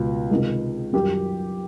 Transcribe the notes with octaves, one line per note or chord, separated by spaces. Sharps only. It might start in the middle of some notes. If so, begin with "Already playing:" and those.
Already playing: C#2 B2
C#2 C3 D#3 G#3
F#2 D#3 G3 G4